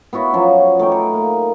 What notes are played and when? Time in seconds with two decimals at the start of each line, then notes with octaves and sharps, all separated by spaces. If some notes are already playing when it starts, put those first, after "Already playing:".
0.13 B3 E4 F#4 E5
0.33 F3 F#3 B3 C#4
0.79 A3 D#4 G5 D6
0.92 A4
1.14 A#3